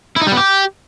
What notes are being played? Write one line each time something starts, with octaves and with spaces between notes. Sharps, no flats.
E4
D#4
G3
B3
G4